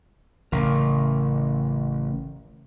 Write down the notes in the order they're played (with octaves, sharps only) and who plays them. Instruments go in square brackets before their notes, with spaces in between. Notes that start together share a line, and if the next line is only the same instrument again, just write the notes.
[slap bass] A1 [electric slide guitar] C#3 A#4